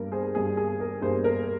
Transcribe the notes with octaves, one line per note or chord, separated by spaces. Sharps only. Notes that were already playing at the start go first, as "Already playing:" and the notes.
Already playing: G2 G3 A#3 A#4
G#4 C5
G2 G3 A#3 G#4
G#4
A#4
G2 G3 A#3 G#4 C5
A#4